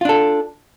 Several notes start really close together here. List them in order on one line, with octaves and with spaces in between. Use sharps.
F4 D4 A4